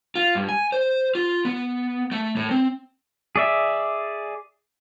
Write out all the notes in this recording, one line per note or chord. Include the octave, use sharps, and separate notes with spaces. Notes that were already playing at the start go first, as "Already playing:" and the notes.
F4
G2
G#5
C5
F4
B3
A3
A2
C4
G#4 D5 E5